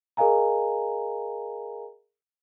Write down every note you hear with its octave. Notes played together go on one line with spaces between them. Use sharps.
G#4 A#4 D#5 F5 G#5 A#5